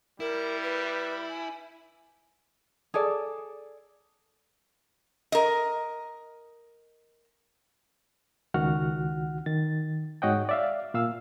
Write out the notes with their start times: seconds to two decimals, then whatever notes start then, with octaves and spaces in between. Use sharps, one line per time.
0.20 G3 E4 A#4
0.63 B4
1.29 G#5
2.94 G#4 A4 D5
5.32 A#4 D#5
8.54 C#2 D#3 F#4 F#5 F6
9.46 D#3 A6
10.22 G#2 F#4 C#5 D#5 F#5 G5
10.49 D5 E5 F5
10.94 A#2 F5 E6